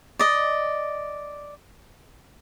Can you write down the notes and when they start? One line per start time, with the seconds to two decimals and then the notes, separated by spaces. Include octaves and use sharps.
0.19 D5 D#5